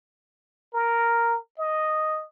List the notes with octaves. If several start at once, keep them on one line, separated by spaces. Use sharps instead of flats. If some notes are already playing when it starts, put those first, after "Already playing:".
A#4
D#5